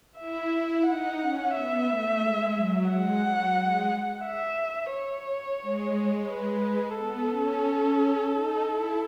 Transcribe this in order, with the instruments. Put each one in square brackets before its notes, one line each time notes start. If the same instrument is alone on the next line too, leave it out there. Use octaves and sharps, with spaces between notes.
[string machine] E4 [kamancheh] E5
[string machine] E4
[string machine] D#4 [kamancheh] F#5
[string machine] C#4
[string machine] B3 [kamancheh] E5
[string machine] A3
G#3
F#3
[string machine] G#3 [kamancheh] F#5
[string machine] F#3
G#3
[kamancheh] E5
C#5
[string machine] G#3
[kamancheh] B4
[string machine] B3 [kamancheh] A4
[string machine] C#4
D#4
E4